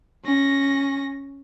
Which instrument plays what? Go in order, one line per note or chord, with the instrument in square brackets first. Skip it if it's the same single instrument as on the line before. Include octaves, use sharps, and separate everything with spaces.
[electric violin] C#4 A#6